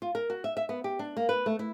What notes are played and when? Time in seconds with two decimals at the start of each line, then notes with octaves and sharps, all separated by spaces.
0.02 F4
0.15 A#4
0.30 F#4
0.44 E5
0.57 E5
0.69 B3
0.84 G4
0.99 D4
1.17 A#3
1.29 B4
1.46 A3
1.59 E4